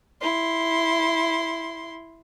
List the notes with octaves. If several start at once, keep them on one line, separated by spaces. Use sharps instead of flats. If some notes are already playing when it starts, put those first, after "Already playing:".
E4 C6